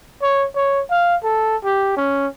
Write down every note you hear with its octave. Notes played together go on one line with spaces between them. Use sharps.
C#5
C#5
F5
A4
G4
C#4